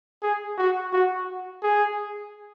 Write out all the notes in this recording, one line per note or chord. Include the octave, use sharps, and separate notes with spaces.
G#4
F#4
F#4
G#4